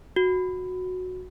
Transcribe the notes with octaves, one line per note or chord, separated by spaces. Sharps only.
F#4